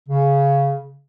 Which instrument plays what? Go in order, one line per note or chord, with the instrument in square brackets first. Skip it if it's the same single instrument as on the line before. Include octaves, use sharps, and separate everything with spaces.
[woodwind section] C#3